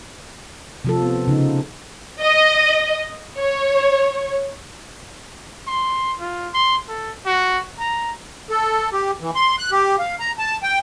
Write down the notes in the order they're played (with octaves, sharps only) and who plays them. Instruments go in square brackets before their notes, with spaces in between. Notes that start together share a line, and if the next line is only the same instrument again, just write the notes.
[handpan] C3 F3 A4
B3
C#3 D#4
[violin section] D#5
C#5
[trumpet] C6
F4
C6
A4
F#4
A#5
[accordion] A4
G4
E3
C6
F#6
G4
F5
A#5
A5
G5